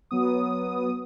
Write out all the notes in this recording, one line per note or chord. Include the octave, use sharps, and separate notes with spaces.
F#3 B3 D#6